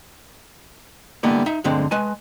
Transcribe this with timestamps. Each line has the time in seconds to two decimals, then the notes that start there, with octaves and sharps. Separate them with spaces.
1.23 D3 G3 G#3 A#3 B3 E4
1.46 D#4 E5
1.64 D2 G2 D3 G#3 C4
1.91 G#3 B4 G#5 A5